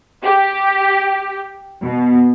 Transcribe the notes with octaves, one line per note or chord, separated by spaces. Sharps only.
G4
B2